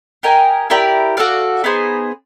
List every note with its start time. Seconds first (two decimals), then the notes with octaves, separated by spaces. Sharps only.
0.23 G4 A#4 D#5 G#5
0.70 E4 G4 A#4 D5
1.17 F#4 A4 D5 F5
1.64 B3 D#4 G#4 C5